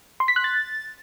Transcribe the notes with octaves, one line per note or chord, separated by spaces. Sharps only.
C6
B6
F#6
A6